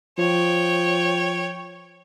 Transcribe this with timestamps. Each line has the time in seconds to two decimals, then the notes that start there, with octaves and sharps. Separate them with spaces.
0.18 F3 C#5 G5